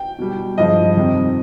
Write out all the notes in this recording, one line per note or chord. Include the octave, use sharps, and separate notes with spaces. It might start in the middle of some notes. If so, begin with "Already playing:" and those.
Already playing: G5
B2 G3
G2 F3 G#3 D#5
F2 C3 D#3 G3